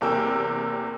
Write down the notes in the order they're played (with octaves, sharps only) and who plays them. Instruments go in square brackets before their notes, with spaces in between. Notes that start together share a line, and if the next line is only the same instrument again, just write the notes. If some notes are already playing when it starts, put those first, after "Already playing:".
[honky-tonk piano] F#1 E2 C3 A#4 G5 E6